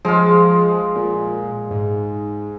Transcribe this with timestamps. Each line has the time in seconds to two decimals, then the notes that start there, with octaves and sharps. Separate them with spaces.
0.05 F3 G#3 F4
0.96 A#2
1.71 G#2